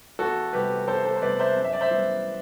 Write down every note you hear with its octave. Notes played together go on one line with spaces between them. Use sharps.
E2 F#4 A4
C3 G3 B3 G4 B4
E2 A4 C5
A4 C5
C5
C3 G3 B3 B4 D5
C5 E5
F#2
E5
D5
C5 E5
E3 G3 B3